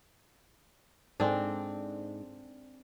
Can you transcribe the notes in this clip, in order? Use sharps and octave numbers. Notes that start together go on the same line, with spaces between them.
G#2 C4 D4 A4 D5 G#5